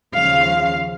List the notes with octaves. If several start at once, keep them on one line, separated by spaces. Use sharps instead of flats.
D#2 C#3 F3 F5